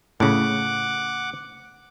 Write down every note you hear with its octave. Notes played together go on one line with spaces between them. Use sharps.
A2 C#3 F#5 D6